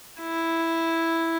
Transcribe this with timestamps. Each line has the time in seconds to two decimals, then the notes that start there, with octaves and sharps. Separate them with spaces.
0.21 E4